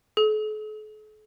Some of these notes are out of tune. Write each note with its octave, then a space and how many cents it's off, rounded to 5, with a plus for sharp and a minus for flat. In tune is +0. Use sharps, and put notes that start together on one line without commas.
A4 -45